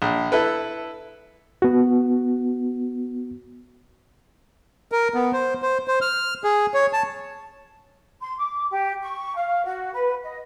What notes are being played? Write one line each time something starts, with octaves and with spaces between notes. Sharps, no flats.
A#1
E4 A4 B4
B3 F#4
A#4
B3
C5
C5
C5
F6
G#4
C#5
A5
C6
D6
G4
C#6
F5
F#4
B4
D#5